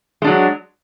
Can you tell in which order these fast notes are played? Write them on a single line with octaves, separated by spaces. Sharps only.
G#3 D4 F#3